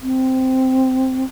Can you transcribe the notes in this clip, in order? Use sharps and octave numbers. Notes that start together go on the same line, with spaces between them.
C4